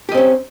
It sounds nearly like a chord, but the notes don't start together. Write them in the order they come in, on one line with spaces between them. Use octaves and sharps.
G4 D#5 C4 C#4